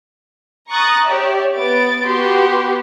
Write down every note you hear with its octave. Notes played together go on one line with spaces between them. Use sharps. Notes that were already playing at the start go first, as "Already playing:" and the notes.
A#5 C#6 D#6 F#6 A6 A#6
G4 C#5 D5 E5
B3 A6 D7
B3 F#4 G4 C6